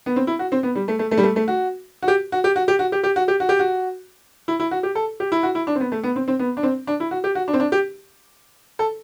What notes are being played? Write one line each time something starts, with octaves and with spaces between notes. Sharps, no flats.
B3
C4
E4
F#4
C4
B3
G3
A3
A3
A3
G3
A3
A3
F#4
F#4
G4
F#4
G4
F#4
G4
F#4
G4
G4
F#4
G4
F#4
G4
F#4
E4
E4
F#4
G4
A4
G4
E4
F#4
E4
D4
C4
B3
A3
B3
C4
C4
B3
D4
C4
D4
E4
F#4
G4
F#4
D4
C4
D4
G4
A4